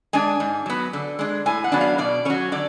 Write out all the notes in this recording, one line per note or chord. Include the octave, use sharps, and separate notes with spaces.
G#3 D4 G#5
G#2
F#3 B3
D3
G#3 D4
A2 G#5
F#5
F#3 B3 D4
F5
B2 D5
F#3 C#4 C#5
D3 D5